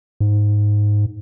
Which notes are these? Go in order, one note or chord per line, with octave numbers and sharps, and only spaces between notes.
G#2